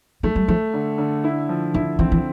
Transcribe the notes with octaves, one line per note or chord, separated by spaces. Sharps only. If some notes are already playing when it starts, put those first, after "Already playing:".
F3 A3
G3
F3 A3
D3
D3
E4
F3
D3 E4
E3 C4
E3